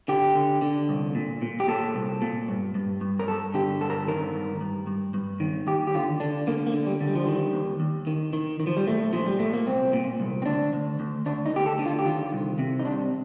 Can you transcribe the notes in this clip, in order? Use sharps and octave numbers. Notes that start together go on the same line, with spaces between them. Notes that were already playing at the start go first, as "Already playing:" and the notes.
D3 G4
D3
D3
C2
A#2
A#2
G4
A#2 A4
C2
A#2
G2
G2
G2
A#4
G2 A4
D3 G4
G2 A4
A#4
A4
D#3 A#4
G2
G2
G2
G2
D#3
D#2 G4
G4
D3 F4
D3 D4
D3 A#3
A#3
D3
G3
D3
G3
F3
D#3 G3
D#2
D#2
D#3
D#3
D#3
F3
G3
A#2 A3
A#2 F3
G3
A#2 A3
A#3
C2 C4
A#2
C2
C4
D2 D4
D2
D2
D2 D4
D#4
D2 G4
A4
D3
F4
G4
D#3 F4
C2
C3
D#4
C2 D4